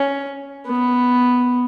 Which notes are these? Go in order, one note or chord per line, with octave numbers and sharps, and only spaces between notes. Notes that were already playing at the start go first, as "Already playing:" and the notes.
Already playing: C#4
B3